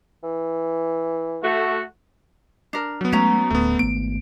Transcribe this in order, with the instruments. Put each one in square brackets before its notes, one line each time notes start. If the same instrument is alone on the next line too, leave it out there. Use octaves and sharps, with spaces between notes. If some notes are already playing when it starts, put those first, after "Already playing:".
[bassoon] E3
[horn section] A3 F#4
[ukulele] D4 A#4
[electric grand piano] F#3 B3
[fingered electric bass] G#3 A3 [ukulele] C#4 A#5
[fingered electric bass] D1 [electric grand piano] A3 B3
[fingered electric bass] G#1 A3 B3 [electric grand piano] D7